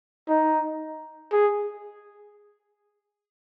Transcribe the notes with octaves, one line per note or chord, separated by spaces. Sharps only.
D#4
G#4